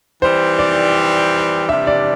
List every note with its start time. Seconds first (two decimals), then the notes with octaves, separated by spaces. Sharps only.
0.22 E3 G3 C4 C5
0.59 D5
1.69 C3 E3 G3 D4 E5
1.87 D5